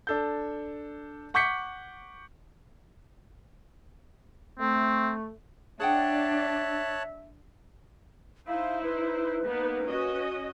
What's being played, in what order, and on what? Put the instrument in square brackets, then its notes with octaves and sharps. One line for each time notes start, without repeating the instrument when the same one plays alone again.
[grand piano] D4 A4 G6
F#5 C#6 D6 G6 B6 C#7
[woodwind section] A3 [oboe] C4
[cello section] D4 [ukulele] G#4 F#5 G5 [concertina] C#5 A5 F#6 [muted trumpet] E5
[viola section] D#4 E4 C5 [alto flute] F5
[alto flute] B4
[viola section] A#3 B3 D#4
C#4 F#4 D#5